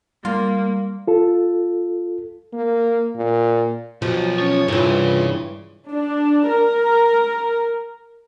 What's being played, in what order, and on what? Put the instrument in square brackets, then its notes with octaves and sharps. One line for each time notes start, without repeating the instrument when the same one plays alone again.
[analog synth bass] G3 [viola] A#3 [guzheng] F4
[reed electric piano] F4 A4
[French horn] A#3
A#2
[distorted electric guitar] B1 [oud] F3 [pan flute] F#4
[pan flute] C#4 [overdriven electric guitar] C#5
[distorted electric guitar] C2 [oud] G2 E3 [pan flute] F4 [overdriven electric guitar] G#4 C#5
[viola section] D4
A#4